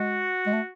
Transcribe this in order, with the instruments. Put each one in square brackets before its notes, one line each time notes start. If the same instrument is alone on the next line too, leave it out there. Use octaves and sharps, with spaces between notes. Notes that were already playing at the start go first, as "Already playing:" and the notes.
Already playing: [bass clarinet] G#3 [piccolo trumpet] F#4
[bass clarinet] G#3
A3